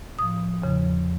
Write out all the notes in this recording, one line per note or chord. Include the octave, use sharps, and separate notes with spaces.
A2 F3 D#6
E2 C#3 F3